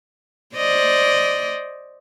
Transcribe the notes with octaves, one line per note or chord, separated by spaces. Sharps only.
C5 D5 D#5